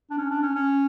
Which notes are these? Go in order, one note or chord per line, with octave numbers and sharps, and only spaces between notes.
D4
C#4
D4
C#4
C#4